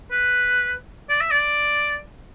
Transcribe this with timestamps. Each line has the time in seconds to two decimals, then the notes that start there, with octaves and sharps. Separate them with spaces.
0.11 B4
1.10 D5
1.21 E5
1.31 D5